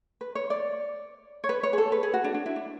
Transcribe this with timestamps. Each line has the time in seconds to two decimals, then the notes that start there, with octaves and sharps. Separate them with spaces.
0.21 B4
0.35 C#5
0.50 D5
1.44 C#5
1.49 B4
1.63 C#5
1.73 G#4
1.78 A4
1.92 B4
2.03 G#4
2.14 F#4
2.24 D4
2.34 D4
2.46 E4
2.56 D4